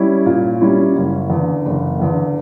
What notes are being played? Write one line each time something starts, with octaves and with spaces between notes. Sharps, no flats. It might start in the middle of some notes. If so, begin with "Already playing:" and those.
Already playing: G3 C#4 E4
A#2
G3 C#4 E4
F#1
E2 D3
F#1
E2 D3